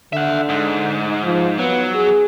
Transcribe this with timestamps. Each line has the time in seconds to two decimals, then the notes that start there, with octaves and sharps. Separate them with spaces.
0.13 D3 E5 F#5
0.49 G#2
1.24 F3
1.59 F#3 B3
1.94 G#4